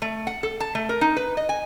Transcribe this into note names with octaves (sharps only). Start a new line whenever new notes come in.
A3
F#5
A4
A5
A3
A#4
D#4
B4
D#5
G#5